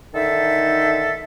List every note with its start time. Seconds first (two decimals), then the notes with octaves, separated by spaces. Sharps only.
0.14 D3 D#3 D#4 A4 E5